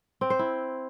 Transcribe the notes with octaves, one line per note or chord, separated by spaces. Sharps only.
C4
C5
E4